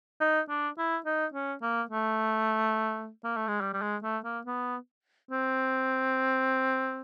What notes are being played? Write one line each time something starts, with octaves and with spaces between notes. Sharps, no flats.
D#4
D4
E4
D#4
C#4
A#3
A3
A#3
A3
G#3
G3
G3
G#3
A3
A#3
B3
C4